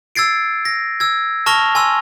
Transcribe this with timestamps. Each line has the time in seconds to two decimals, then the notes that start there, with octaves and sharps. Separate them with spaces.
0.15 E6 G#6 A6 C7 D7
0.65 A#6
1.00 E6 G#6
1.46 A5 C#6 F6 A#6 F7 G7
1.75 G#5 C6 E6